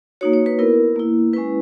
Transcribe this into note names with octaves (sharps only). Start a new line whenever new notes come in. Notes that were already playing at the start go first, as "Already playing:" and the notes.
A#3 D#4 F#4 C#5
C#5
B4
B3 E4 A#4
A#3 E4
G#3 C#4 E4 B4